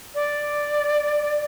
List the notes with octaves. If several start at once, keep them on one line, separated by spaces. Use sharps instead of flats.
D5